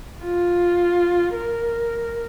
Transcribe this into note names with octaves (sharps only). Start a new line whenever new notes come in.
F4
A#4